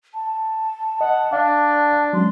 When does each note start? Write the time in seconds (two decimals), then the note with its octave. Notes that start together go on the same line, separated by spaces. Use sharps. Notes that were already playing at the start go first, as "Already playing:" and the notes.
0.14 A5
1.01 D#5 F#5
1.32 D4 F5
2.13 F#3 G#3 C#4 C6